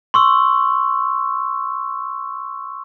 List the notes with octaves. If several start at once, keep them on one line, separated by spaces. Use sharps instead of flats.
C6 C#6 E6